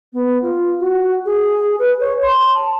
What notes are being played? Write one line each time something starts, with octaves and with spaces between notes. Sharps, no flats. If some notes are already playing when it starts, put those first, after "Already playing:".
B3
F4
F#4
G#4
B4
C#5
C6
A5